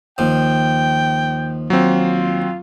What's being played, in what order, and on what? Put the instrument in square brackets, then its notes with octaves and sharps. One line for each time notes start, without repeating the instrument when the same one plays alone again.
[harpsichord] D#2 F3 [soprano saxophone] G5
[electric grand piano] F#3 C4 [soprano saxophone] F4